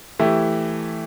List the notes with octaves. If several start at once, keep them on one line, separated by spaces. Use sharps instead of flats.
E3 A3 E4 G4